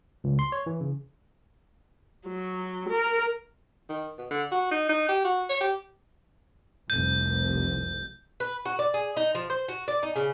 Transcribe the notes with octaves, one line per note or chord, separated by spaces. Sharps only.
C#2
C6
C#5
E3
C#3
F#3
A#4
D#3
B2
D3
F#4
D#4
D#4
G4
F#4
C#5
G4
F1 C2 F2 G6
B4
F#4
D5
G#4
D#4
F3
C5
F#4
D5
D#4
C#3